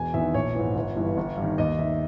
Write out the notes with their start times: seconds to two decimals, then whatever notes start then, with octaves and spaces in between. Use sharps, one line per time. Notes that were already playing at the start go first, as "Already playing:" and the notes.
Already playing: E1 G#5
0.14 E2 D#3 E5
0.34 A#1 C#5
0.55 G#2 E3
0.76 G1
0.96 G2 E3
1.17 G1
1.37 G2 D#3
1.58 D#2 D#5
1.79 D#3 E5